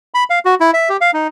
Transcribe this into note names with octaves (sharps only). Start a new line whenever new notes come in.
B5
F5
F#4
E4
E5
G4
F5
D#4